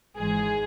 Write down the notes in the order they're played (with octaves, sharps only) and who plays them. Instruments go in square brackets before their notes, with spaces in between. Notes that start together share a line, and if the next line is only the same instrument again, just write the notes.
[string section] G#1 G#2 E3 G#3 G#4